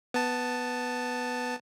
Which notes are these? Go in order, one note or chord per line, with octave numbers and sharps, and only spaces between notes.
B3 A5